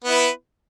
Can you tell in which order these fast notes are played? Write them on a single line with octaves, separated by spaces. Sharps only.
B3 E4 B4